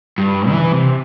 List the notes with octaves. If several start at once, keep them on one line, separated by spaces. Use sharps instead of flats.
G2
E3
C3